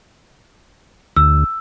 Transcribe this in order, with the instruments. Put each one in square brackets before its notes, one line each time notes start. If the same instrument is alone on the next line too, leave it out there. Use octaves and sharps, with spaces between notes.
[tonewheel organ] D2 [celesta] E6